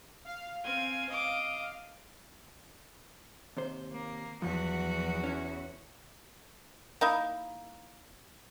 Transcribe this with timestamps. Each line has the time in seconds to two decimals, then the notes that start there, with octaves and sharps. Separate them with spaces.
0.25 F5
0.63 C4 G#5
1.09 D#5 D6
3.57 D#2 C3 C5
3.92 A#3
4.42 E2 F3 F#3 F#4
5.24 C#4 E4
7.01 A#3 D#4 E4